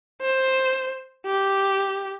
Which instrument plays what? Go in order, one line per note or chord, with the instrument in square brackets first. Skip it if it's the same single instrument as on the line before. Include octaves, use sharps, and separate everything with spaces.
[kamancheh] C5
G4